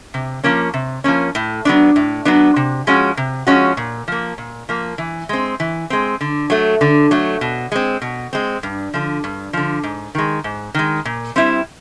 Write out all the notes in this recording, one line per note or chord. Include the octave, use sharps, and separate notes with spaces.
C3
F3 A#3 C#4
C3
F3 A#3 C#4
A2
F#3 B3 D4
A2
F#3 B3 D4
C3
F3 G#3 C#4 F#4
C3
F3 G#3 C#4 F#4
A#2
F3 A#3
A#2
F3 A#3
E3
G#3 C4
E3
G#3 C4
D3
F#3 A3
D3
F#3 A3
B2
G#3 C4
B2
G#3 C4
G2
D3 F3
G2
D3 F3
G#2
D#3 G#3
G#2
D#3 G#3
A#2
G3 C4 E4